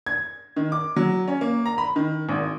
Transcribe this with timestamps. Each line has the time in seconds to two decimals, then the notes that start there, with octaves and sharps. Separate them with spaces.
0.07 G#6
0.56 D#3
0.72 D6
0.96 F#3
1.28 C#4
1.41 A#3
1.66 A#5
1.78 B5
1.96 D#3
2.29 G#1